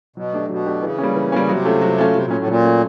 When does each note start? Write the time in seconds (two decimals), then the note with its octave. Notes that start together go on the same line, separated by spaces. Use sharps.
0.16 B2 F#3
0.33 A3 D4 G4
0.49 B2 F#3
0.66 A3 D4 G4
0.82 C#3 E3
0.99 G3 A#3 C#4
1.15 E3
1.32 G3 A#3 C#4
1.49 C3 F#3
1.65 A3 C#4 F4 A4
1.82 F#3
1.98 A3 C#4 F4 A4
2.14 C3 F#3
2.25 A#2
2.31 A3 C#4
2.37 A2
2.47 A#2 F#3
2.64 A3 C#4